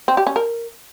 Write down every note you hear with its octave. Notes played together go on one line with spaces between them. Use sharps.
C4
G4
C#4
A#4